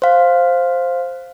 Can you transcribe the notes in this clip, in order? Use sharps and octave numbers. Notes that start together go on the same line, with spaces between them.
C5 F5